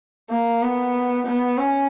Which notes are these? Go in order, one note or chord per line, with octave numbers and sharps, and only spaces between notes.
A#3
B3
B3
C#4